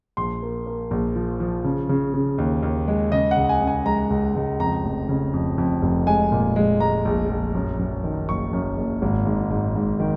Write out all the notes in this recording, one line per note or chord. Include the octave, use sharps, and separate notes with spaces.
A#1 C6
A#3
A#3
A#1
F3
F3
C#3
C#3
C#3
D#2
D#2
G#3
C#3 D#5
F#5
C#2
G#5
C#3
G#5
G#3 A#5
C#2
C#2
F2 A#5
F1
C#3
F2
F2
F1
G#3 G#5
A#2
G#3
G#3 A#5
A#1
A#1
F#2
F#2
D#3
F#1 C#6
F#2
F#1
G#1
G#2
G#2
G#2
D#3